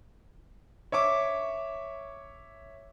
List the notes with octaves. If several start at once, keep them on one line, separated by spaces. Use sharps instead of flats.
C#5 E5 C#6 D6